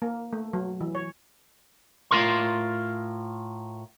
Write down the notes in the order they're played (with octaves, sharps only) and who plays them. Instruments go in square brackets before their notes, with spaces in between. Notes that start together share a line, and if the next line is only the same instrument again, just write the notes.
[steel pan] A#3
A3
F#3
E3
C#5
[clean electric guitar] A2 F4 A#4 C6